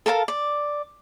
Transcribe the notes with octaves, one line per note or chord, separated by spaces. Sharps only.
A4 A#4 F5 A5
D5